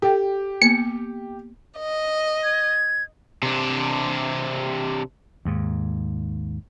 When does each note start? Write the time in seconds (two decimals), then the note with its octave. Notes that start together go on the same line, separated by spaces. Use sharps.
0.02 G4 A4 G5
0.62 A#3 B3 C#7
1.79 D#5
2.44 G#6
3.43 C3 D4
5.45 D#2 G#2